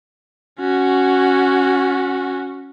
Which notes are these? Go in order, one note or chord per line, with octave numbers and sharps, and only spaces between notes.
C#4 F#4